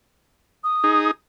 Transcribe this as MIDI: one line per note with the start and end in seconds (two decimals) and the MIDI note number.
0.64 1.10 87
0.84 1.11 63
0.84 1.11 68